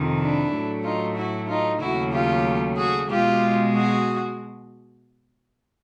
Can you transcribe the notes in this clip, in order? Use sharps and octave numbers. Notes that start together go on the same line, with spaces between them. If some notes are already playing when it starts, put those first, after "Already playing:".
Already playing: F2 C3 D#3
D4 E4
A2 F#3 A3
D#4 F4
E4 F#4
D#4 F4
D#2 C#3 F#3 A3 E4 F#4
F4 G4
F#4 G#4
B2 G#3 F4 G4
F#4 G#4